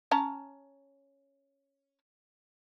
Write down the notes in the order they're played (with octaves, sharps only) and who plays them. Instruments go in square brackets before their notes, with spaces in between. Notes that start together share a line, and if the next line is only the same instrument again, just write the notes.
[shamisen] C#4 A5 A#5